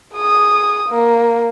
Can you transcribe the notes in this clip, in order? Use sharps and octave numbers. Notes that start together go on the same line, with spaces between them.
G#4 D#6
A#3